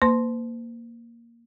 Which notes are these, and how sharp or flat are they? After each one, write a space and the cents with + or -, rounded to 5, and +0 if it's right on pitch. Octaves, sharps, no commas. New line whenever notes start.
A#3 +0 C5 -45 C6 +0